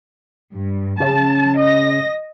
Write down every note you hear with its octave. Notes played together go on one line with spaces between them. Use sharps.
G2
C#3 A5
D#5 A#6